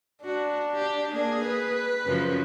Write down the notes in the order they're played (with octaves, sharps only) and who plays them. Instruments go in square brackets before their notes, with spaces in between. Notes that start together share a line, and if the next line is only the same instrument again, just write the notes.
[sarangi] D4 [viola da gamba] F#4
[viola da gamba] G4
[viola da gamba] A#3 G#4 [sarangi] D4
[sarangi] B4
[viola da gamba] F#2 C#3 F3